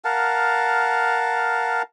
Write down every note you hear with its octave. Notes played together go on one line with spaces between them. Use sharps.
A#4 F5 F#5 A5